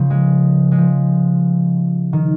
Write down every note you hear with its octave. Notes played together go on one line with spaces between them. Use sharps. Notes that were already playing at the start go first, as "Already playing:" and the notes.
Already playing: C#3 F3
G#3
G#3
F3
D#3